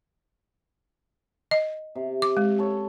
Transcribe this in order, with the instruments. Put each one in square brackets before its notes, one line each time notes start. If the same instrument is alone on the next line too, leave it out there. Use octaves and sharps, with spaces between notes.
[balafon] D#5
[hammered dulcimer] C3
[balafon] D6
G#3
[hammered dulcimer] A4 C#5